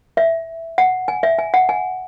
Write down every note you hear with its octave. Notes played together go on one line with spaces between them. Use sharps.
E5
F#5
G#5
E5
G#5
F#5
G#5